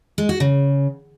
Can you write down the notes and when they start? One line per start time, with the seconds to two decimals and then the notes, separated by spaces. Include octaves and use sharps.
0.18 G#3
0.29 F#4
0.40 C#3